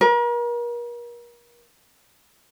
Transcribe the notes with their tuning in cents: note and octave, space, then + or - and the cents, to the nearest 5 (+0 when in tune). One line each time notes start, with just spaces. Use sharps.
A#4 +40